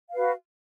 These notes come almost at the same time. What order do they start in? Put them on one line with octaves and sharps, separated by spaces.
F5 B4 F#4